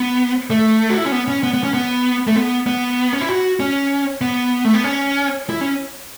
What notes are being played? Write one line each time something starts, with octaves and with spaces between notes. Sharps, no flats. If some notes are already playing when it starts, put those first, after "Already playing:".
Already playing: B3
A3
F#4
E4
C#4
B3
C#4
B3
B3
C#4
B3
A3
B3
B3
C#4
E4
F#4
C#4
B3
A3
B3
C#4
E4
C#4